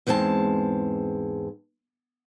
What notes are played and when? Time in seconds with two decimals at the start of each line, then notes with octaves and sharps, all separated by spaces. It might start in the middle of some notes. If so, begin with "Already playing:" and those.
0.07 E2 G#2 G#3 C4 A5